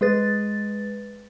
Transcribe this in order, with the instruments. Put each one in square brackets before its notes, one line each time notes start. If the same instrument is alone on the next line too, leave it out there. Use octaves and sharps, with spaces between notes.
[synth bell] G#3 G#4 B4 A6